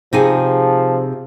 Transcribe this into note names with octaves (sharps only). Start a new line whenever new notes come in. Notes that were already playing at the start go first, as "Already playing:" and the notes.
C3 F3 D#4 G#4